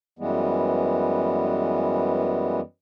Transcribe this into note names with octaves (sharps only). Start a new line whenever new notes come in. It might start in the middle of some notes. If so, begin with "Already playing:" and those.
F#2 E3 G3 G#3 B3